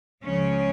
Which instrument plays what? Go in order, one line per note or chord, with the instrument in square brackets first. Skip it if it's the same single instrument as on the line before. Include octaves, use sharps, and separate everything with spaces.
[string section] C#2 C#3 F3 C#4